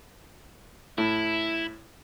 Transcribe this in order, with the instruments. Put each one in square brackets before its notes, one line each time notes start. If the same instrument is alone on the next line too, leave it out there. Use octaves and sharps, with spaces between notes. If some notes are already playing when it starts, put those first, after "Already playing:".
[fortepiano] A2 [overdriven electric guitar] E4